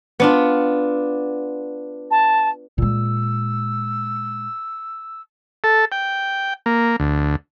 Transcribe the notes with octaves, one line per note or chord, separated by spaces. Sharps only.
B3 D4 F4
A5
A#2 G#3 E6
A4
G5
A#3
D2